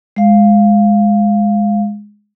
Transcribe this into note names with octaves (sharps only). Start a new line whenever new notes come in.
G#3 F5